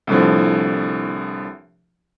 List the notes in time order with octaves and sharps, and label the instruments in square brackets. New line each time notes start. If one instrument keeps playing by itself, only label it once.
[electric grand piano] C2 A2 D3 F3